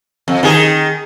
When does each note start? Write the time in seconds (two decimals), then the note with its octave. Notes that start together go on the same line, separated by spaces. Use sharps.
0.28 F2
0.43 D#3 G#4